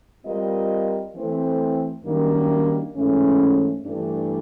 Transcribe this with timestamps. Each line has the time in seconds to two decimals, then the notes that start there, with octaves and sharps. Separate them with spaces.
0.25 G3 C4 F4 A#4 D#5
1.15 E3 A3 C4
2.05 F#2 D#3 G3 A#3 D4
2.95 G#2 E3 A3 C#4
3.85 G2 E3 A3 D4